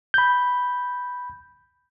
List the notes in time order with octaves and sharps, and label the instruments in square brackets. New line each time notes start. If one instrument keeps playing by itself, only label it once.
[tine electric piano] B5 G6